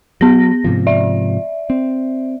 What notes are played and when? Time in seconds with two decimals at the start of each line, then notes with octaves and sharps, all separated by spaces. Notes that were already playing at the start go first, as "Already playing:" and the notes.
0.21 F#3 B3 A#6
0.64 G#2 C3 F3
0.87 D5 E5
1.70 C4